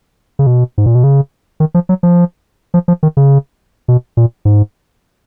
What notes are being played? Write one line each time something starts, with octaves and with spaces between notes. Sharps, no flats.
C#3
B2
G#2
A#2
B2
C#3
D#3
F3
F#3
F3
F3
F3
D#3
C#3
B2
A#2
G#2